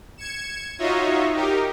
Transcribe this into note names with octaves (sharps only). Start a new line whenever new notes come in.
G#6 C#7 E7
D#4 F4 F#4 C#5 D#5 E5
D#4 G4 A#4